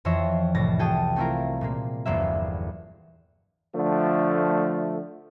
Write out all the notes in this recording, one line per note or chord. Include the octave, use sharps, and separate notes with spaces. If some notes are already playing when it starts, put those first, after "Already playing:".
F2 E3 C#5 E5 C6 A#6
C2 A2 A6 A#6
F#4 G#4 G5 A5 D#6
A3 A#3 C4 E4 F4 A#4
A#2 G#3 A#3
G1 E2 F#3 A#3 C5 E5
D3 F3 A3